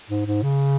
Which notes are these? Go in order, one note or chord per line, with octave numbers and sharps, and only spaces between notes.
G#2
G#2
C#3